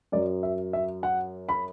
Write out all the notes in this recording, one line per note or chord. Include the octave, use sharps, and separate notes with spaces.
F#2 F#3 D5
E5
E5
F#5
B5